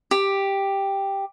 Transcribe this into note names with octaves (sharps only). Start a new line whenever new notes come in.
G4